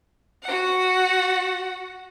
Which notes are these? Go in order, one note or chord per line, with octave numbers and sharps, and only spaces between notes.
F#4 F#5